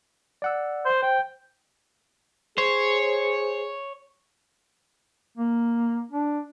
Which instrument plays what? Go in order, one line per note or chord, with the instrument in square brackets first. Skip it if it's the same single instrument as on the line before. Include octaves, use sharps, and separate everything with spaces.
[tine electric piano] D5 F#5 E6
[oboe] C5
[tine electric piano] C5 [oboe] G5
[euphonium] G#4 [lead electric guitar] C5 [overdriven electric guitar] C#5
[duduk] A#3
D4